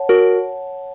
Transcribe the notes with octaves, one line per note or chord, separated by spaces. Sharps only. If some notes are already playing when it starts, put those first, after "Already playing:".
Already playing: C#5 F#5 A5
F#4 A#4